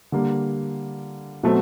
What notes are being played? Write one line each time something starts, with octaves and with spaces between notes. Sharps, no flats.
D3 G3 A#3
B2 F#3 A3 C4